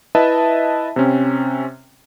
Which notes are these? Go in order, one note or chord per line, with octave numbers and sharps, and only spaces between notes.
E4 B4 D#5 E5 A5
C3 C4 C#4